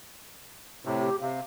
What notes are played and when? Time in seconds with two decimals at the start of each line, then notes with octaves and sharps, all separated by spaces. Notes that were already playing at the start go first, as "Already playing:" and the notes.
0.85 A2 C3
0.99 G4
1.21 C3 F5